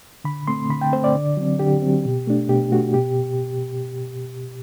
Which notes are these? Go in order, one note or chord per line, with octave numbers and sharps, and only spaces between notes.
D3 B5
A3 C4 C6
D3 B5
G5
A3 C4 C5
D5
D3
F#3 C4
D3 G4
F#3 C4
B2
A3 D4
B2 G4
A3 D4 F#4
B2 G4